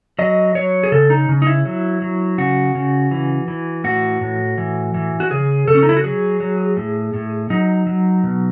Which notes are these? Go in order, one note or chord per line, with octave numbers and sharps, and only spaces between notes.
F#3 D#5
F#3 C#5
G#4
C#3 A4
D#4
C#3
D#4
E4
F#3
F#3
C#3 F#4
C#3
E3
E3
A2 F#4
A2
E3
E3
F#4
C#3 G#4
C#3 A4
C#4
D#4
E4
F#4
F#3 G#4
F#3
A2
A2
F#3 D#4
F#3
B2